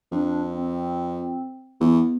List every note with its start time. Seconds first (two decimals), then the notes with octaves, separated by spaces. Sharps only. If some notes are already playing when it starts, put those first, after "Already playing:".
0.12 F2 D4
0.54 C4
1.80 E2 B3